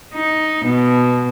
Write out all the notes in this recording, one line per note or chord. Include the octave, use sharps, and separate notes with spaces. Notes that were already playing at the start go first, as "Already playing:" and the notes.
D#4
B2